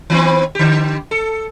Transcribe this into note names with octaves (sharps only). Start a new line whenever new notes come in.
D#3 B3 C4
D3 G4
A4